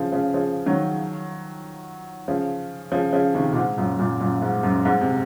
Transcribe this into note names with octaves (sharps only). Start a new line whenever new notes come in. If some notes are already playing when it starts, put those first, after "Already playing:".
Already playing: C#3 F3
C#3 F3
C#3 F3
D#3 F#3
C#3 F3
C#3 F3
C#3 F3
C3 D#3
A#2
G#2
F#2 A#2
F#2 A#2
F#2 A#2
G#2
F#2
G#2
C3